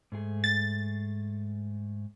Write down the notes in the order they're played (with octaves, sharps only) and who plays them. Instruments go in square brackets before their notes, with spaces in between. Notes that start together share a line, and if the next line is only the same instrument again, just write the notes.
[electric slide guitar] G#2 A3 G#4
[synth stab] A6